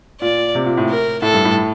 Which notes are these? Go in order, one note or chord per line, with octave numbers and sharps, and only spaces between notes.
A#2 D5
C3
A#2
A2
A#4
A2 A4
G2
A2